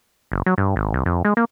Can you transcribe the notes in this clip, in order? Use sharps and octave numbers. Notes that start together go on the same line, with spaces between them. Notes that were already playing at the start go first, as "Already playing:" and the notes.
F#1
F#3
G2
G#1
C2
F2
G#3
A#3